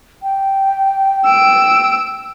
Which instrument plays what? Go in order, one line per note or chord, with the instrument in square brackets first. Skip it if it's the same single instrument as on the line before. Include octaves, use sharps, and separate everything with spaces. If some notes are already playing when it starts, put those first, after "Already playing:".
[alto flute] G5
[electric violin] E6 D7